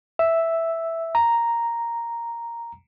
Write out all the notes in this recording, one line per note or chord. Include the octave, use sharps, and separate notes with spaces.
E5
A#5